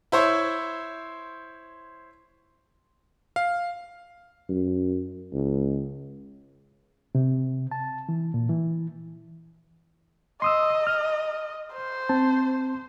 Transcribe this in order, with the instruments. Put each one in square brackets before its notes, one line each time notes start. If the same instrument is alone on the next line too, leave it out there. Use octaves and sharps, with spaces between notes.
[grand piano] E4 C5 C#5
[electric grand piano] F5
[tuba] F#2
C#2
[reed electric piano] C3
A5
E3
A#2
E3
[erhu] D#5 [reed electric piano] C6 D#6 E6
[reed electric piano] F6
[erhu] C5
[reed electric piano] C4 A5